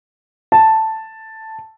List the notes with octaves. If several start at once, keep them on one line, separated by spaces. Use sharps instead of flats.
A5